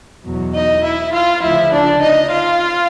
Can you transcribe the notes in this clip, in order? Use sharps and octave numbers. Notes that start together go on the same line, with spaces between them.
E2 B2 F#3
D#4 D#5
E4 E5
F4 F5
D2 C#3 F3 E4 E5
D4 D5
D#4 D#5
F4 F5